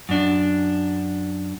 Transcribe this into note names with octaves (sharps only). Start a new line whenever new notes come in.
F#2 D4